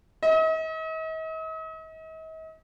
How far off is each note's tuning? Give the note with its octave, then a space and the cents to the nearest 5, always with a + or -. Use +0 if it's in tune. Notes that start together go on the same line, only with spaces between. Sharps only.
D#5 +45